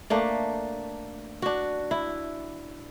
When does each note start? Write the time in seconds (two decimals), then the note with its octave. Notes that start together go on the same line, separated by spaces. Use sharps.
0.10 A3 A#3 D4
1.42 D4 F#4
1.91 E4